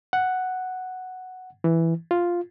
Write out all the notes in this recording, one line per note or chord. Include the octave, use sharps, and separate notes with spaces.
F#5
E3
F4